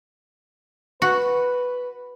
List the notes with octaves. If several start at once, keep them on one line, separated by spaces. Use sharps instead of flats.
F#4 B4